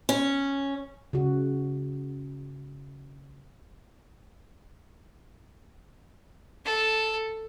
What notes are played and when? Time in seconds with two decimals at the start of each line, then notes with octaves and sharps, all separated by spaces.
0.09 C#4
1.13 C#3 F#4
6.65 A4